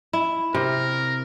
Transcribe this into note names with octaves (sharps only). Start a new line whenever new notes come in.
E4
C3 A#4